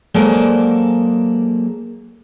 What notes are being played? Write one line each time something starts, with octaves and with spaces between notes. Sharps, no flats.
F#3 G#3 A#3 A4 C5 D5